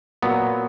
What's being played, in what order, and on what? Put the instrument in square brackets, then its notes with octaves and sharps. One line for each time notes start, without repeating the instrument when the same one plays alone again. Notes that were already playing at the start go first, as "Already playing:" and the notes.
[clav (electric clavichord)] A#2 F#3 B3